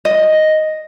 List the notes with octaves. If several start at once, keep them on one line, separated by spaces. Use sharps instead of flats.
D#5